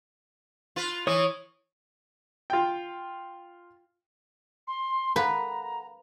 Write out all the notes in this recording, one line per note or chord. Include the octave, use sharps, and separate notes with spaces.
F4 B4
E3 C#5 D#6
F4 G5
C6
A4 B4 F5 F#5 A#5